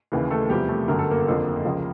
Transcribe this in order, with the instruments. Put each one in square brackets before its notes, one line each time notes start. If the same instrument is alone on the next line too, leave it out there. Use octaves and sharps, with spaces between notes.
[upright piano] D#2 C#3 E3
A3 A4
E2 C3 F3 G3 G4
A3 A4
G1 F#2 D3 A#4
A4
A#3 A#4
F#1 F2 D3 F3
C#2 C#3 F3